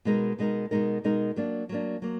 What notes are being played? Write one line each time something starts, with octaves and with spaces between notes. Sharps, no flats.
B2 G#3 D#4 A#4
B2 G#3 D#4 A#4
B2 G#3 D#4 A#4
B2 G#3 D#4 A#4
F#3 A#3 D4
F#3 A#3 D4
F#3 A#3